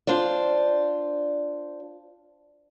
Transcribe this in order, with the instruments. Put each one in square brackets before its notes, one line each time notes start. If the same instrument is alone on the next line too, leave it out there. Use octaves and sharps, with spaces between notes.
[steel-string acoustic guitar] D4 F4 C5 D5